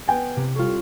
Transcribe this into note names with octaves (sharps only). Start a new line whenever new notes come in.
B3 G5 G#5
C3
G3 F4 A4 C#5